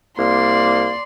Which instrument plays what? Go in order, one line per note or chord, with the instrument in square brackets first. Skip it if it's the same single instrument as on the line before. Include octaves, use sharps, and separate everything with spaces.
[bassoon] C2 [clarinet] A#3 [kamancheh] D5 C6